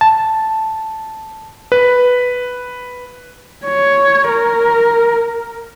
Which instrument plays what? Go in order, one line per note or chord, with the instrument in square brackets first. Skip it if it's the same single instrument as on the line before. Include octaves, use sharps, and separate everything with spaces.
[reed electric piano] A5
[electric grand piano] B4
[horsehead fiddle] C#5
A#4